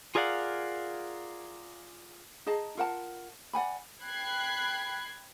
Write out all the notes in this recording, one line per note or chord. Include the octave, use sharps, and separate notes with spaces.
F4 G#4 A#4 D5 F5 F#5
D#4 G#4 D#5 A5
F4 A#4 F#5 A5
D5 F#5 G#5 B5
G5 B5 F#6 G#6 C7